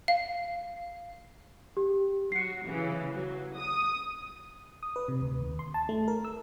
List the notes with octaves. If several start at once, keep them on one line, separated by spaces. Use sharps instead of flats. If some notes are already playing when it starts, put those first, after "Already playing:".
F5
G4
F#3 F#4 C7 C#7
C#3 E3
F#3
D#6
D#6
B4
C3
D2
D#2
C6
A5
A3
A#4
E6